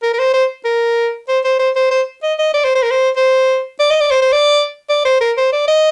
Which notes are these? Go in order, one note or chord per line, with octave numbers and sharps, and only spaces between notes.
A#4
A#4
C5
C5
A#4
C5
C5
C5
C5
C5
D#5
D#5
D5
C5
C5
A#4
C5
C5
D5
D#5
D5
C5
C5
D5
D5
C5
A#4
C5
D5
D#5